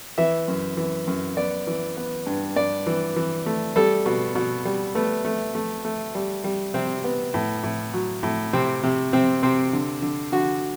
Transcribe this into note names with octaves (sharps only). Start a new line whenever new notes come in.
E3 E5
F#2
E3
F#2
B3 D5
E3
B3
G2
G2 D5
E3
E3
A3
G3 A4
B2
B2
G3
A3 B3
A3
A3
A3
G3
G3
C3 C4
B3
A2
A2
F#3
A2
C3 C4
C3
C3 C4
C3 C4
D3
D3
D3 F#4